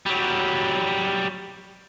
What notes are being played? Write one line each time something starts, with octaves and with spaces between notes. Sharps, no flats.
F#3 G3